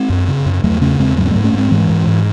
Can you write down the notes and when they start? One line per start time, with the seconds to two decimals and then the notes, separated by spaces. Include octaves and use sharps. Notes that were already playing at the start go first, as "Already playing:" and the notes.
Already playing: G#3 C4
0.10 F#2
0.28 C#3
0.46 F#2
0.64 E2 F#3 A3
0.81 C#3 A3 C#4
0.99 E2 G#3 C4
1.17 G#2 F#3 A3
1.25 C4
1.31 G#2 F#3 A3
1.44 A3 C#4
1.54 G#2 G#3 C4
1.71 G#2 E3 G#3
1.90 G#2
2.07 G#2